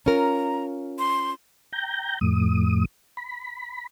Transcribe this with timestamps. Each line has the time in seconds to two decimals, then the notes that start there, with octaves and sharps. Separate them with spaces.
0.06 C#4 F4 A#4 A#5
0.99 C6
1.72 G5 A#5 G6
2.21 F2 A2 D#6
3.17 B5